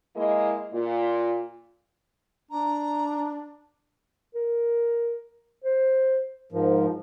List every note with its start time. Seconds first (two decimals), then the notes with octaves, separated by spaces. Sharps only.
0.15 G#3 A#3 E4 D#5
0.73 A#2 F4
2.51 D4 A#5
4.35 A#4
5.64 C5
6.52 G#2 F3 A#4